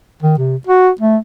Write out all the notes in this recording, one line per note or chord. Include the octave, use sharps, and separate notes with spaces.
D#3
C3
F#4
A3